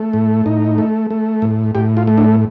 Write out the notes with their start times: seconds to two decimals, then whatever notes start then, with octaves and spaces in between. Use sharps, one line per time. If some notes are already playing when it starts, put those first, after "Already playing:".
Already playing: A3
0.13 A2
0.46 A2 D#4
0.78 A3
1.10 A3
1.42 A2
1.75 A2 G4
1.97 F4
2.07 A3
2.18 D4